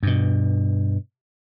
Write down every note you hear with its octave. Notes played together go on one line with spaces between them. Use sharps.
G2 B2